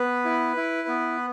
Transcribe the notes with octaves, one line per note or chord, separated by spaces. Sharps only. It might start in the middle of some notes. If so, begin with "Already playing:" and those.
Already playing: B3 B4
E4
E4
B3